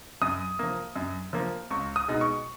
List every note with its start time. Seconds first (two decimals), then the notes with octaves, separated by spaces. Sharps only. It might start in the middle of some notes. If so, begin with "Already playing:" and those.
0.22 F#2 D#6
0.59 F3 A#3
0.96 F#2
1.33 F3 A#3
1.71 C#2 C#6
1.96 D#6
2.08 B2 G#3 D#4
2.21 C#6